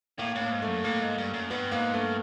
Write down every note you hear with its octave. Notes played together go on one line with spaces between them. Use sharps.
A2 A#3
A2
A#3
G#2
A3
F#2
A2 A#3
G#2
G2
F#2
G2 B3
G#2 A#3
G2 A3